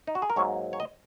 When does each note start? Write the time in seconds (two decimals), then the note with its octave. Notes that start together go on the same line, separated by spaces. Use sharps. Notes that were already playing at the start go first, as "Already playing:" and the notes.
0.07 D#4
0.15 F#4
0.22 G#4
0.30 A#4
0.36 G#2 F#3 A#3 C#5
0.73 C#5
0.80 D#5